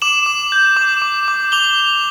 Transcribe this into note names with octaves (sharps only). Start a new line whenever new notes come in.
D6 E7 F#7
D6
G6
D6
D6
D6
D6 F7 G7